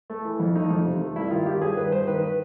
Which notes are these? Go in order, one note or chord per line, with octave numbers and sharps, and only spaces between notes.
A3
E3
F2
A3 D#4
F2
C3
A3
G2 E4
D#3 F4
D#3 G4
G2 G#4
D#3 B4
G2 C5
D#3 B4
B4